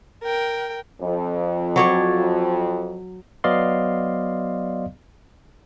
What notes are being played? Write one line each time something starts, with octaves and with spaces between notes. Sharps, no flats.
A#4 G5
F2
F#3 C#5 D5
F#3 B3 D5 D#5 F5 C6